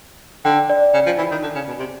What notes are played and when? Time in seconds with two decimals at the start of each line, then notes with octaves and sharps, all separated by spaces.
0.45 D3 G5
0.70 D5
0.94 C#3
1.06 F3
1.18 E3
1.31 D#3
1.43 D3
1.55 C#3
1.68 B2
1.79 C3